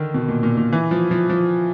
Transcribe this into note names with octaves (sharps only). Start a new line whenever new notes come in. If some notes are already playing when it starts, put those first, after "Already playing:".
Already playing: D3 D#3
B2
A#2
A#2
A#2
E3
F3
F3
F3